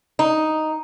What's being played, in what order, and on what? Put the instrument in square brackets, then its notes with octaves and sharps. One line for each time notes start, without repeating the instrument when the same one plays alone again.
[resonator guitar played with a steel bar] D#4